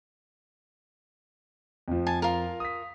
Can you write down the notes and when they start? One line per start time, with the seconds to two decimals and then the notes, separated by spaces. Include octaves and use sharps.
1.88 F2 F3
2.07 G#5 A5
2.22 F4 A#4
2.60 D#6 B6